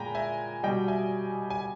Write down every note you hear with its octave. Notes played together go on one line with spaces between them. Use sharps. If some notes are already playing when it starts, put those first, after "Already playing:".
Already playing: A#2 G#3 G5 G#5 A#5 B5
E5 G#5
B2 G3 D#5 G5
E5 G#5
G#5